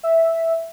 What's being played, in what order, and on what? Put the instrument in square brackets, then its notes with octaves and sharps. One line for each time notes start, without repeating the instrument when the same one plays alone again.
[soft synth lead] E5